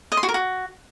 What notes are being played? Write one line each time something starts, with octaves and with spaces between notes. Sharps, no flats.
D#5
C6
F#4
A#4
F#4